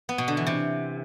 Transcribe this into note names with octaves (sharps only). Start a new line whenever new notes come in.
B3
B2
D3
E3
C3